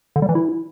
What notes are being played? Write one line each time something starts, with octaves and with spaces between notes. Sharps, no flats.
D3
G3
E3
E4